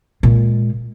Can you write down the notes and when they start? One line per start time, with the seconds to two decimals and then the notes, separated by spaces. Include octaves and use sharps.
0.23 A#2 G#3